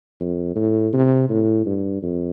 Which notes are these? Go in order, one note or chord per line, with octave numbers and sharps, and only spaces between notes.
F2
A2
C3
A2
G2
F2